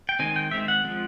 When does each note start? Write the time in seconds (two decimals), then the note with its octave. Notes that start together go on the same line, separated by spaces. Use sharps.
0.09 G5
0.19 D#3 G#3 C4 G#5
0.36 G5
0.51 D#3 G#3 C4 E5
0.68 F#5
0.84 F3 G#3 C4